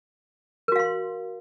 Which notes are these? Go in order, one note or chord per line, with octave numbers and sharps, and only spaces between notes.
F#4 A#4 F5 C6